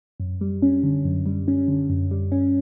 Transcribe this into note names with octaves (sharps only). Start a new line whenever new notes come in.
F#2
G3
C#4
D3
F#2
G3
C#4
D3
F#2
G3
C#4